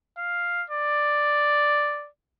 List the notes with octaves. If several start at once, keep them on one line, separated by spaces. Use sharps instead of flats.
F5
D5